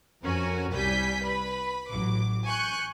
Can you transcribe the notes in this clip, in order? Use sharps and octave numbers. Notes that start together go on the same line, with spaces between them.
F2 C#4 F#4 A#4 G#5
C2 G3 G#5 G6 B6
B4 B5
A1 F#3 D6
G#5 C#6 F#6 G6 C#7